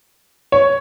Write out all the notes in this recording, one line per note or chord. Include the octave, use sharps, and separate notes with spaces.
C#5